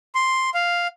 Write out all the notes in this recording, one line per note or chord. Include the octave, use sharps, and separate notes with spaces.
C6
F5